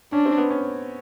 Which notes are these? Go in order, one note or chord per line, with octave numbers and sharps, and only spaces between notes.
C#4 D4
C4
B3
C#4